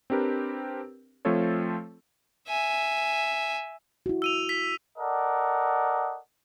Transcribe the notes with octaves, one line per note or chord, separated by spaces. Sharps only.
C4 D4 G4 A#4 B4
F3 A3 C4 F4 A4 C#5
E5 G#5
E4 F#4
E6 D#7 F7
B6
A4 A#4 D5 D#5 F#5